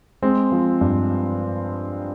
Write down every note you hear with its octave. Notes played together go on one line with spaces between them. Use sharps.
G#3 C4
F3
G2